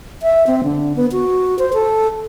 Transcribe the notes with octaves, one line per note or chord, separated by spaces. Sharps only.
E5
C4
D3
B3
F#4
C5
A4